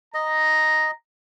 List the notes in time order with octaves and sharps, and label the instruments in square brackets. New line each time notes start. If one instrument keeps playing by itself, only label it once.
[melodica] D#5 [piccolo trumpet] A#5